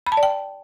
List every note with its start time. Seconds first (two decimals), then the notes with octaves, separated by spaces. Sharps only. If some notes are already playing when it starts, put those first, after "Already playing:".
0.07 B5
0.12 A5
0.17 D5
0.23 G5